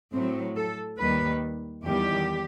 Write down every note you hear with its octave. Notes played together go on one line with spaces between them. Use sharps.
A2 F#3 C4
A4
D#2 D#3 G3 B4
E2 D#3 G3 G4